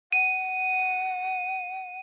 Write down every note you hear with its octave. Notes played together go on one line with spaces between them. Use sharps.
F#5 D#7